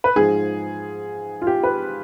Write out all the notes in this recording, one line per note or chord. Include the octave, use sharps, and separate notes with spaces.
B4
G#2 F3 G#4
F4
G4
B4